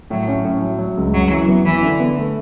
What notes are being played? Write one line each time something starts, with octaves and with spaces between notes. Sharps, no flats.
A2 F#3
C#4
A2
F#3
F#3
C#2
F#2 F#3
E3
B3
E3 B3
D3
B3
A3